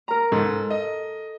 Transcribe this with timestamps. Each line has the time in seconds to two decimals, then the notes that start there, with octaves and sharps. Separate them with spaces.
0.08 A#4 A#5
0.32 G#2 A4
0.70 D#5